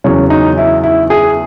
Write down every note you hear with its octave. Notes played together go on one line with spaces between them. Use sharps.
E2 C#3 F#3 C#4
D#4
E4
E4
G#4